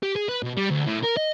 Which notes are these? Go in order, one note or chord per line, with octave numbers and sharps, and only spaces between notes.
G4
G#4
B4
B2
G3
D2
A2
A#4
D#5